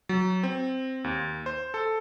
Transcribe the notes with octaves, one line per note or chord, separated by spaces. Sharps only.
F#3
C4
D#2
C5
A4